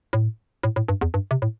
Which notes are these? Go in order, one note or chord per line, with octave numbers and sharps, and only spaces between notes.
A2
A2
A2
G2
E2
G2
C3
A2